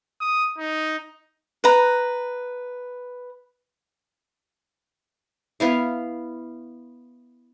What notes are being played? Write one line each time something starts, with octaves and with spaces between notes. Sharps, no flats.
D#6
D#4
B4 A#5
B3 E4 F5